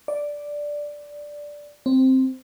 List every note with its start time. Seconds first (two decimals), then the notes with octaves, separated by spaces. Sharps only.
0.08 D5
1.86 C4